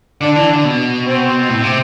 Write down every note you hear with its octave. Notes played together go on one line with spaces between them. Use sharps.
D3 D4
E3
D3
B2
C4
A2
C3